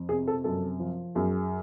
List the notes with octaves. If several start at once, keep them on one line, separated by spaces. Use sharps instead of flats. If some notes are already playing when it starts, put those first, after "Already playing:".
Already playing: F2
C3 G#4
A4
F#2 A4
F3
F#2 G#4